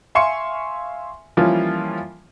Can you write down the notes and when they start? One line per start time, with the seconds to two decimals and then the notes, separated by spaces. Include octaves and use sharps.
0.15 E5 F5 G#5 C6 C#6 C#7
1.37 E3 F3 G3 A#3 C#4 F4